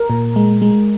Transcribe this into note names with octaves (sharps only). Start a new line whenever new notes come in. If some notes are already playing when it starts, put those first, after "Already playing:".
Already playing: A#4
A#2
G#3
G#3